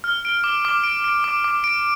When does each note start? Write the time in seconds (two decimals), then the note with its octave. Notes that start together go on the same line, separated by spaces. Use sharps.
0.04 F6
0.25 D7
0.44 D6
0.65 D6
0.84 D7
1.04 D7
1.24 D6
1.44 D6
1.64 D7